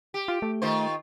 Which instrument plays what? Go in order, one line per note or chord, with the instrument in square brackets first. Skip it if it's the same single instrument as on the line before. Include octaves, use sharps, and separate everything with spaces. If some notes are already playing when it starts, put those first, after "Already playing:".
[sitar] G4
[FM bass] F4
A3
[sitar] D#3 F4 C5